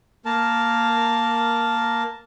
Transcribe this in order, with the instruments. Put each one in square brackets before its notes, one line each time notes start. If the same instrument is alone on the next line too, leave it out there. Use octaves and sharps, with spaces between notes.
[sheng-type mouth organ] A#3 A#4 A5